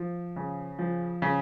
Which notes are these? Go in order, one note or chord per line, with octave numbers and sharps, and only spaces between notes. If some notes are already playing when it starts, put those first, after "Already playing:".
Already playing: F3
C#3
F3
C#3